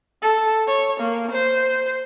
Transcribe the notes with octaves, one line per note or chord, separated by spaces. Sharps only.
A4
C#5
A#3
C5